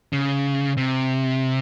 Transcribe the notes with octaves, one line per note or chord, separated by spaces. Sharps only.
C#3
C3